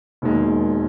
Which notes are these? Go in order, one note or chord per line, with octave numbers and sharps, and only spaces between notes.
E1 D#2 D#3 G#3